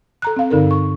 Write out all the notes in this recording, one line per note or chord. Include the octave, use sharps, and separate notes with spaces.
A4 A#5 F#6
C4 F5
G2 D3 D#4 A4 A#4
C#6